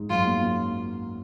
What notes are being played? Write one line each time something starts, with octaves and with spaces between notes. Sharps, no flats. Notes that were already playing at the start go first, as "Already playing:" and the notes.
Already playing: G#2
F#2 F4
A#3